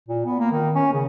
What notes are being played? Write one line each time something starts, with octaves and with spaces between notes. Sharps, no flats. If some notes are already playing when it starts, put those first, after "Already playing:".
A#2
B3
A#3
D#3
C#4
C#3